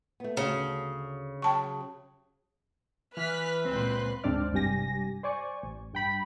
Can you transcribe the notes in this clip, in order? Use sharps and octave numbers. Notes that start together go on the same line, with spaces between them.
A3 B3
D2 C#3 F#4 A4
F#3 G5 A5 C#6
E3 B4 F6 F#6 B6
C#2 A#2 C4 C6 F#6
D2 G#2 C4 D4 D5 F6
G#1 G2 C3 G4 G#5 A#6
C5 D5 G#5 C#6
A1
G2 G5 B5